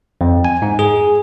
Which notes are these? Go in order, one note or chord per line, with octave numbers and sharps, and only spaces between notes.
F2
G#5
G#2
G#4